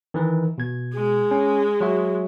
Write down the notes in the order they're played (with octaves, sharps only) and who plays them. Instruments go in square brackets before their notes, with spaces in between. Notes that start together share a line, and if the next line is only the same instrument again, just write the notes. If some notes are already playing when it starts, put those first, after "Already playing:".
[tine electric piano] D#3 E3 B4
B2 G#6
[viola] G#3
[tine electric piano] C#4
F#3 F#4 E5